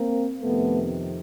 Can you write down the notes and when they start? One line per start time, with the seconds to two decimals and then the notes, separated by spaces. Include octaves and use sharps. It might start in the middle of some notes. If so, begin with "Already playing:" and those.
Already playing: A#3 C4
0.41 F2 C3 D#3 A3 B3